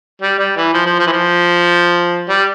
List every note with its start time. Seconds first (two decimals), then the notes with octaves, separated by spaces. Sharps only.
0.22 G3
0.38 G3
0.56 E3
0.74 F3
0.86 F3
0.99 F3
1.06 E3
1.12 F3
2.29 G3